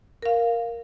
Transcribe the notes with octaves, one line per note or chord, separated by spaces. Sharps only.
A#4 F5